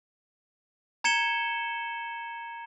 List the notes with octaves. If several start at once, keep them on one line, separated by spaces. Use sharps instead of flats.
A#5 G#6 C#7 E7 G7